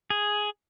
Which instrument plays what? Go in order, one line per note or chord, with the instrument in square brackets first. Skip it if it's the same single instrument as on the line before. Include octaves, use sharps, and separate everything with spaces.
[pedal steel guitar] G#4